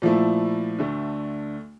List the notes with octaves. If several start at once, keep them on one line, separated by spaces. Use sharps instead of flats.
A#2 F3 A3 E4
D2 D3 A3